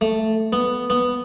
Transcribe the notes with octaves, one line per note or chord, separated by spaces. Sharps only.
A3
B3
B3